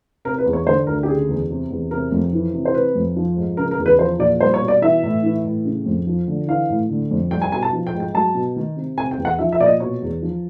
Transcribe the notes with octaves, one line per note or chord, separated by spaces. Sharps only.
C3 A#4
B4
E2
C#5
D3 C5
D2 A#4
G4
C#3 G#4
E2
C3
E2
C3 A#4
F2
E3
C3
C5
C3 B4
F2
F3
G#2
C#3 A#4
A#4
E2
B4
F3 C5
A#2 D5
G3 C5
C#5
B2
D5
E3 E5
A2
E3
A2
C#3
F2
F3
D3
E3 F5
A2
D3
F2
G3 G5
G#5
B2 G#5
A5
F3
G5
G#2
G5
F#3 A5
B2
D#3
C3
C3 G#5
G5
E2
F#5
F3 E5
E5
A#2 D5
D#5
B2 C#5
E2
F3